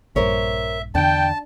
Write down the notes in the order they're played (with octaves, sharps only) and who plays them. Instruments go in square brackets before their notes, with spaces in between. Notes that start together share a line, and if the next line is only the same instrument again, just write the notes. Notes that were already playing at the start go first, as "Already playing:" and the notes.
[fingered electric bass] A#1 G2 [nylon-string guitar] A#4 C5 C#5 [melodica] E5
[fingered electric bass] E2 D3 [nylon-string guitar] D4 [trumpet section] G5 [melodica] A5